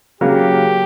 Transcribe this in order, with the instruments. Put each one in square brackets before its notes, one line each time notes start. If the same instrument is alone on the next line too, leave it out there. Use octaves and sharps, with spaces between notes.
[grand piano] C#3 F#3 A#3 [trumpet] G4